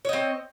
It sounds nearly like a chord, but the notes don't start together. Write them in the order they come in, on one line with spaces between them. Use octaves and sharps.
C#5 D#5 C4